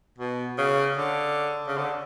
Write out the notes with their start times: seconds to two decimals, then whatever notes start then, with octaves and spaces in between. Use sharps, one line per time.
0.18 B2
0.58 C#3
0.97 D3
1.67 C#3
1.77 D3